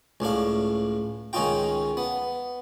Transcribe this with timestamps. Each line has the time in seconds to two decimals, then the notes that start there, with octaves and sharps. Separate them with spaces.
0.20 C#2 A2 D4 F5
1.33 C#2 D#3 C#4 D#4 F4 G5
1.97 B3